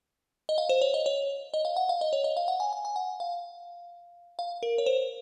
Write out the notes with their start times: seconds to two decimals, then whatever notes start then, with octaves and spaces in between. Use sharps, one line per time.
0.49 D#5
0.58 F5
0.69 C5
0.81 C#5
0.94 D#5
1.06 C#5
1.54 D#5
1.65 F5
1.76 F#5
1.89 F5
2.01 D#5
2.13 C#5
2.24 D#5
2.37 F5
2.48 F#5
2.60 G#5
2.73 G#5
2.85 G#5
2.96 F#5
3.20 F5
4.39 F5
4.63 A#4
4.78 C#5
4.86 C5